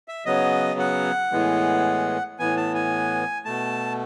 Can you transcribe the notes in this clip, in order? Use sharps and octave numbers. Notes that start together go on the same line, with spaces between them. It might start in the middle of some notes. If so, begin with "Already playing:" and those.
E5
C#3 F#3 B3 D#5
F#5
A2 E3 G#3 B3
A2 E3 B3 G#5
A5
G#5
B2 A3 A5